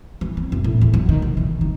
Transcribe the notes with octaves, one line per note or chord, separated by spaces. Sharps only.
E3
C4
F#2
A2
E2
F#3
D#3
C3
E3
D#3